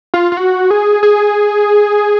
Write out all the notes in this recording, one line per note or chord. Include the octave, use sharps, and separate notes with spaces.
F4
F4
F#4
G#4
G#4